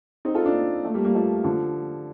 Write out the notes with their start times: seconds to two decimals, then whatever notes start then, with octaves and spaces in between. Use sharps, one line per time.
0.25 C4 D#4
0.35 F4 A4
0.45 D4 F4
0.85 F3 A3
0.94 G3 A#3
1.04 G3 A#3
1.15 F3 A3
1.44 D3 F3